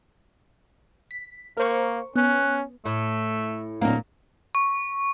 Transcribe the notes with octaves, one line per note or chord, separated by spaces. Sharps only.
B6
A#3 A#4 C5 C#6
B3 C#4 F#6
A2 A3
D1 A#2 A#3 A#4
C#6